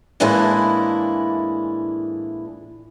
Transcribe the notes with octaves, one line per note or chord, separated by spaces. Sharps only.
A2 E3 G#3 A#3 D4 E4